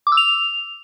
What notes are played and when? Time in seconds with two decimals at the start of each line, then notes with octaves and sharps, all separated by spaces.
0.07 D6
0.12 E6
0.17 F7